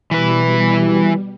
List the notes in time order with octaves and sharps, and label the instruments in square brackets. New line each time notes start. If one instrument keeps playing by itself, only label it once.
[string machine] B2 G3 [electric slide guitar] E3 B4